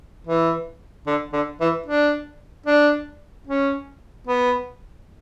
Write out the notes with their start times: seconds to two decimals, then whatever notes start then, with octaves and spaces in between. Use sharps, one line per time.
0.27 E3
1.07 D3
1.33 D3
1.61 E3
1.86 D4
2.66 D4
3.47 C#4
4.27 B3